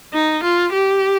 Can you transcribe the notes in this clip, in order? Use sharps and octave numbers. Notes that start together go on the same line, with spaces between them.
D#4
F4
G4